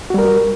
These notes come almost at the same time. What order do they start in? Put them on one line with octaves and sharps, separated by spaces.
F#4 G3 A#4